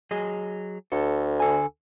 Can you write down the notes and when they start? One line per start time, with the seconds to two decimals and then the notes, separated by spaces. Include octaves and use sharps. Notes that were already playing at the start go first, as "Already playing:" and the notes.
0.11 F#3 G#4 D#5
0.92 D2 A4
1.40 D3 A4 G#5